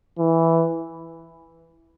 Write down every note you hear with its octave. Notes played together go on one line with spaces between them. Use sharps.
E3